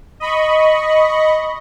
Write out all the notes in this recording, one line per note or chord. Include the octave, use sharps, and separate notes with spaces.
D#5 B5 C#6